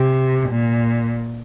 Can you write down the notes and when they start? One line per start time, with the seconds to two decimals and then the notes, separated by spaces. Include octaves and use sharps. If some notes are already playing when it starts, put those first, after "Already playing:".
Already playing: C3
0.49 A#2